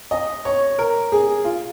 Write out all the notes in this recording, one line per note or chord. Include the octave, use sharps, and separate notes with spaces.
D#5
C#5
A#4
G#4
F4